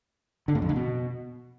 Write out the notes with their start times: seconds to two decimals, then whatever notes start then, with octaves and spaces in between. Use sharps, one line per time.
0.48 D3
0.55 A2
0.62 F2
0.69 D3
0.76 B2